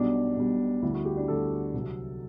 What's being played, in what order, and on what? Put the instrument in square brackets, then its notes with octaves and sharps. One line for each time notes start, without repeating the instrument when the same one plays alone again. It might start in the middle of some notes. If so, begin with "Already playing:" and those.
Already playing: [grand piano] B1 B2 G3 D4
B1 B2 G3
D2 D3 G3 E4
F#4
G4
D4
D2 D3 G3 A4
C2 C3 F#3